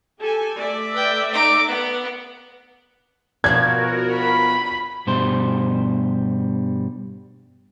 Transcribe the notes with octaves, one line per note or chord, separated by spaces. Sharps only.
G4 A4 G#5
A3 D5 E5
B4 G5
D#4 D6
B3
B2 F3 D4 F#4 A#4 G#6
B5
G2 B2 G3 C5